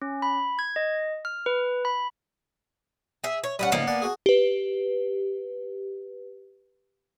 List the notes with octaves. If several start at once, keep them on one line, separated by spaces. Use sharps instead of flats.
C#4
B5
G#6
D#5
F6
B4
B5
G#4 E5
C#5
G3 C#4 B4 D#5 F#5
G#2 C#3 F3 A#3 B3 D4
D5 F#5 G#5
F#4 G#4
G4 B4